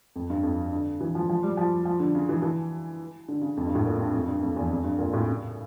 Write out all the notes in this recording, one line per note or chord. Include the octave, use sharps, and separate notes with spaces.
F2
G2
F2
D3
E3
F3
F3
G3
F3
F3
D3
C#3
E3
E3
D3
C#3
F2
G2
A2
A#2
G2
F2
G2
F2
E2
F2
G2
A#2
A2
C#3